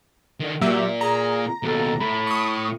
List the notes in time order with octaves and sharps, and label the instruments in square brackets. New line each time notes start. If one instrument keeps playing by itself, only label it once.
[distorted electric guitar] D3 D#3
[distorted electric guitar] A#2 [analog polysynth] F#3 A#3 E5 [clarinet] G4
[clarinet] G#4 [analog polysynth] A#5
[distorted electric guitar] D#2 B2 [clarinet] A4
[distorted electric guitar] A2 [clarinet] B5
[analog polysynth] C#6 D#6